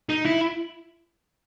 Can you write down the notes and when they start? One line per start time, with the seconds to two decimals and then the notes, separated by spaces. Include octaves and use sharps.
0.09 D#4
0.25 E4